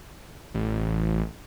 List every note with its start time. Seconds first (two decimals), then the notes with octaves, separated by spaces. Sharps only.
0.54 A1